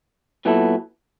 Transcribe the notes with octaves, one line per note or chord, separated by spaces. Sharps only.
A#2 F#3 B3 E4 A4